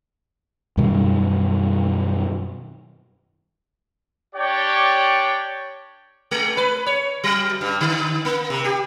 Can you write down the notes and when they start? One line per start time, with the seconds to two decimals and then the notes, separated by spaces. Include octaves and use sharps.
0.77 F#2 B2 D#3 G3
4.35 D4 G4 C#5 D5 G5
6.31 G#3
6.57 B4
6.86 C#5
7.24 F#3
7.61 G2
7.81 D3
8.25 A#3
8.50 C3
8.64 G4